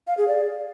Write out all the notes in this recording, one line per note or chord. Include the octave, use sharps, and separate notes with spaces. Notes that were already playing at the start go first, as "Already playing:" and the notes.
F5
G#4
D5